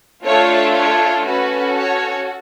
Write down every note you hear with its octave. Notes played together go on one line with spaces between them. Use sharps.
A3 D4 F4 A4 C#5
C#5
C#4 F#4 A4 B4
C#5